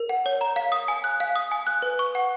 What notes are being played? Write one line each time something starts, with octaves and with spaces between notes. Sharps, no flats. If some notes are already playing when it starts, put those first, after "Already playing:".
Already playing: A#4
F#5
C#5
A#5
F5
D#6
G#5
F#6
F5
D#6
G#5
F#6
B4
C#6
F#5